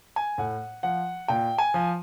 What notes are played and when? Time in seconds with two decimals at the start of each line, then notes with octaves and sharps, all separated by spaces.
0.16 G#5
0.38 A2 F#5
0.83 F3 F#5
1.28 A#2 G5
1.58 G#5
1.74 F3